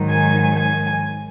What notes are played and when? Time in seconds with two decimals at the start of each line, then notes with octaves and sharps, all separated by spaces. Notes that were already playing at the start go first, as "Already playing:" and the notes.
Already playing: G#2 D#3 F#3
0.09 G#5
0.55 G#5